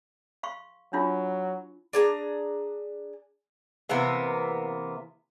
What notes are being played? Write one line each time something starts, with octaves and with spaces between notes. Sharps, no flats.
F5 C6 C#6
F#3 D4 E4 F4
D4 G#4 A#5
C3 E3 A#3 B3